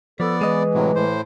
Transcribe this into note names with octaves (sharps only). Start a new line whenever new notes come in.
F3 B3 A4 D5
E3 G#3 D#5
A2 C3 F#3
A2 C5